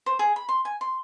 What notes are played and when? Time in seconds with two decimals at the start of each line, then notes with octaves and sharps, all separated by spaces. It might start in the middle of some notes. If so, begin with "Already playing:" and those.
0.06 C5
0.19 G#4
0.36 B5
0.49 C6
0.65 G#5
0.81 C6